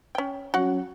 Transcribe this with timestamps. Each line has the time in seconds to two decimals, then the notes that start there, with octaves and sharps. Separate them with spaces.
0.15 C#4 G5
0.54 F#3 C#4 F#4 F#5